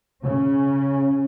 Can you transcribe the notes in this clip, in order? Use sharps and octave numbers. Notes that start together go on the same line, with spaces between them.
C#3 C#4